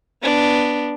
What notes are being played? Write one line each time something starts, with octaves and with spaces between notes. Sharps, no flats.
B3 D4